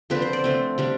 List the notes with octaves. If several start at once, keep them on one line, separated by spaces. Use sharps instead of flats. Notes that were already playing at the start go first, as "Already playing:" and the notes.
D3 F3 C4 B4
C5
D5
D3 A3 C4
D3 G3 D4